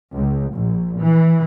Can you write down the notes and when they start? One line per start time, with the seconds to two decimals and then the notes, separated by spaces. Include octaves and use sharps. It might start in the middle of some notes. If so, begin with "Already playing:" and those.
0.15 C#2
0.52 A#1
1.00 E3